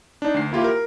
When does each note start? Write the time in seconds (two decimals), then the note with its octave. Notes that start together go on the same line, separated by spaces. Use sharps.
0.22 D4 D#4
0.34 D2 C7
0.51 A#3 E4 F4 G4
0.64 A#4